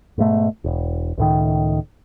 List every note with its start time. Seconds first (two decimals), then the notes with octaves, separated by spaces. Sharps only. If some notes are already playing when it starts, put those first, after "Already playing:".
0.18 G#2 B2 A3
0.64 E1
1.18 C#2 A2 D#3